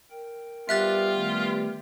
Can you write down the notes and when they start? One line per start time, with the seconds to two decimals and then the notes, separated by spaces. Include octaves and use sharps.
0.11 A#4 G5
0.69 G3 B3 F4 G4 E5 F#6 A6
1.15 D#3 A3